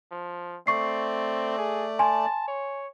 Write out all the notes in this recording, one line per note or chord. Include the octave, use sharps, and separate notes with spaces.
F3
A3 C4 D5 C#6 C7
G#4
G#5 A5 C6
C#5